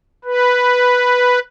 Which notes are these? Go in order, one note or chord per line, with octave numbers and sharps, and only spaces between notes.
B4